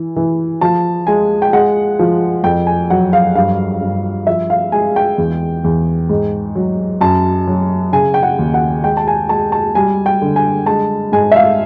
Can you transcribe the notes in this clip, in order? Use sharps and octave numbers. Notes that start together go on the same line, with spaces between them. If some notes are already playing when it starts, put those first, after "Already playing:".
Already playing: E3
E3
F3 A5
G#3 G#5
G5
G#3 F#5
F3
F2 G5
G#5
F#3 F#5
F5
G2 F5
G2
F3 E5
F5
G#3 G#5
G5
E2
E2
G#2
F#3
F#2 A5
F#3
C#3 G#5
G5
F#5
D#2
F#5
G#3 G5
A5
G#5
G#3 A5
A5
G3 G#5
G5
D3
G#5
G#3 A5
G#2 G#5
E5
F5